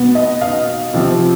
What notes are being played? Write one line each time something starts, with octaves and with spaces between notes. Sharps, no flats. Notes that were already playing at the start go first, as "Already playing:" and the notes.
Already playing: B2 B3
D#5
F5
C3 F3 C4